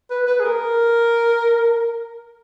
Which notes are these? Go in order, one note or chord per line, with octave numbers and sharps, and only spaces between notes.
B4
B4
G#4
A#4